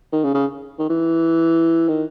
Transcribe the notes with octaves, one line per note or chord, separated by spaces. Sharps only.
D#3
C#3
C#3
D#3
E3
D#3